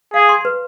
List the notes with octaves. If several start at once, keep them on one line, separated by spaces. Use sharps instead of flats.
G#4 F5
C6
B4